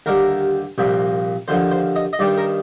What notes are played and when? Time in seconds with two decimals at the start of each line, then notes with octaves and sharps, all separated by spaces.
0.06 D#2 D3 G3 A#4
0.78 C2 A#2 F3
1.48 D#2 D3 F3 C5
1.71 C5
1.96 D#5
2.13 D#5
2.19 G2 D#3 G3 D5
2.38 A#4